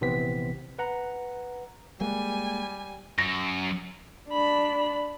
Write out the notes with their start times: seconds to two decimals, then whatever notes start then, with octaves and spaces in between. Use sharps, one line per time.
0.01 A#1 C3 E3 B3 C4 B6
0.79 B4 F#5 A#5
2.01 G3 G#3 A#3 G#5
3.19 F#2 A#6
4.30 D4 B5